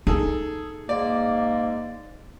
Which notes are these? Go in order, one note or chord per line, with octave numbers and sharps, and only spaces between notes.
D#4 G#4 A4
G#2 A#3 D5